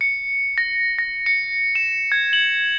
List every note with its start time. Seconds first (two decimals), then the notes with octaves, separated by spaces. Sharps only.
0.01 C#7
0.58 A#6
0.98 A#6
1.26 C#7
1.75 E7
2.12 G#6
2.33 F#7